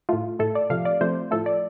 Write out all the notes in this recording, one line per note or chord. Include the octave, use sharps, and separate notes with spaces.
A2 A3 F4
A2 A3 A4
D5
C3 F3 A3 F5
D5
C3 F3 A3 C5
A2 F3 A3 A4
D5